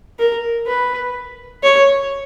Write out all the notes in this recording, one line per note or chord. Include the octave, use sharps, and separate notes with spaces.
A#4
B4
C#5